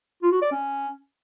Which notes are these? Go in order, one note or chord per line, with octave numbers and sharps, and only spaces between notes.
F4
F#4
D5
C#4